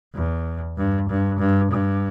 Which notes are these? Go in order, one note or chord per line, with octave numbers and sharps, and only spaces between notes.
E2
G2
G2
G2
G2